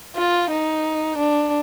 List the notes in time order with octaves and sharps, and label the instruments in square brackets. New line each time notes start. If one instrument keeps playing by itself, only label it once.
[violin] F4
D#4
D4